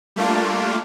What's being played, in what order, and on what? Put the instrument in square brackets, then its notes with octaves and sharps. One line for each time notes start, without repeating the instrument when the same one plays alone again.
[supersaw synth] G3 A3 A#3 D4 F4